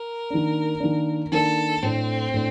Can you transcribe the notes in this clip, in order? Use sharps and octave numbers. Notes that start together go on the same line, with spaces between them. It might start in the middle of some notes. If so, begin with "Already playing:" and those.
Already playing: A#4
D#3 A#3 D4
D#3 A#3 D4
D#3 A#3 D4 A4
A2 A3 C4 D4
A2 A3 D4